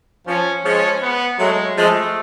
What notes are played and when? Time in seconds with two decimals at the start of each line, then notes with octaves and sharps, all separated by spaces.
0.27 F3 C#4
0.64 F3 G#3 C#4
1.02 B3
1.39 F#3 G#3 A3
1.77 F3 G#3 A3